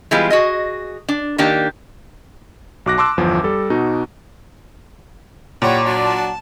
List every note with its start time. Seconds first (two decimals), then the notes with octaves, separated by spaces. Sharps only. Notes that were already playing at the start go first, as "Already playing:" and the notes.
0.11 E3 G3 G#3 B3 F4
0.30 F#4 G#4 D#5
1.08 D4
1.38 D#3 A#3 D4 G4
2.86 B1 F#4 D6 F#6 A#6
2.98 A5 C6 D6 E6 F#6
3.17 G1 E2 F3
3.44 G3 A4
3.70 B2 D#4 F#4
5.62 A#2 E4 G4 C#5 F#5
5.86 F#3 D4 F#4
6.03 A5